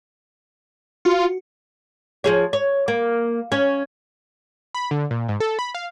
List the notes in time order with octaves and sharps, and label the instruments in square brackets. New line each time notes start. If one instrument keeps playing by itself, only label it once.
[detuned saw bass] F4 [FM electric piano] F#4
[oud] F3 G#4 C#5
C#5
A#3
C#4 C#5
[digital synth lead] B5
D3
A#2
G#2
A4
B5
F5